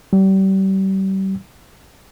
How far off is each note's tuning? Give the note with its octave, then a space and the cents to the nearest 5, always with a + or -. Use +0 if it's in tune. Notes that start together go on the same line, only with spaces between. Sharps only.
G3 -35